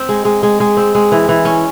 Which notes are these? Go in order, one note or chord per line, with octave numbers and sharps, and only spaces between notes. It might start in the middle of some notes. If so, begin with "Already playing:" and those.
Already playing: C4
G#3
G#3
G#3
G#3
C4
G#3
E3
E3
C#4